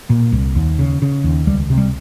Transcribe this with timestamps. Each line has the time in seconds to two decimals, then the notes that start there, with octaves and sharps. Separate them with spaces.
0.10 A#2
0.32 C2
0.55 D#2
0.79 C#3
1.02 C#3
1.24 D#2
1.47 C#2 G3
1.70 C3
1.78 G3